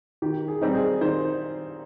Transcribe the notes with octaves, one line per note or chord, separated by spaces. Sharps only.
D#3 G4
G#4
G3 C4 D#4
G#4
D#3 C5